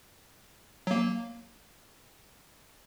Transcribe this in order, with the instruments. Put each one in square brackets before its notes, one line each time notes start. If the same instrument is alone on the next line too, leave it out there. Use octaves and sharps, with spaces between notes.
[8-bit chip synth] F#3 A#3